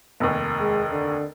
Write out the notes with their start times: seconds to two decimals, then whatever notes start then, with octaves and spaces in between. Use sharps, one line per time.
0.20 F1 D#2
0.60 G#3
0.92 D3